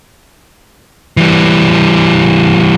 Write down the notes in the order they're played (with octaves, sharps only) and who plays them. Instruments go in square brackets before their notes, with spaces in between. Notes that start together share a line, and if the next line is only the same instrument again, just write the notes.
[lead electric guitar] E3 G3